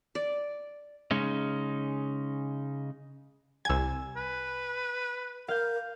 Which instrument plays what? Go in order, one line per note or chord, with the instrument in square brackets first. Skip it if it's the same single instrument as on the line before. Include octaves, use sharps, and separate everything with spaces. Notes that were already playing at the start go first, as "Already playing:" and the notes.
[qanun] D5
[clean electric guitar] C#3 G#3 C#4 D#4
[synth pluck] C2 G#6 [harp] G#5 E6
[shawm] B4
[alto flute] A#4 [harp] F5 G6